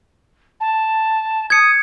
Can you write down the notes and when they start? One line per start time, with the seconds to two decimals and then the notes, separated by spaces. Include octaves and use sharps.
0.60 A5
1.50 D#6 G#6 C#7